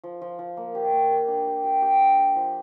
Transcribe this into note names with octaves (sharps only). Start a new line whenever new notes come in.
F3
F3
F3
A#3
G4
A#3
G4
D4
G4
G4
G4
D4
G4
F3